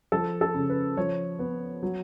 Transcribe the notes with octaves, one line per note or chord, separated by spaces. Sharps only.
F3 A4
A4
C#3
B4
F3 C#5
B3
F#3